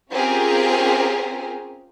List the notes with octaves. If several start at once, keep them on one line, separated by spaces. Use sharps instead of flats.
C4 C#4 F4 G4 G#4 A#4